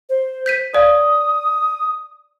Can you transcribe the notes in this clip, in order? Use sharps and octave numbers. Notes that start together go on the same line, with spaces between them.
C5
G6 B6 D#7
C#5 D5 F5 D#6